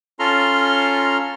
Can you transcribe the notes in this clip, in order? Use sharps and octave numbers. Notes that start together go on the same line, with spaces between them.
C#4 F4 A4 A#5 C6 F6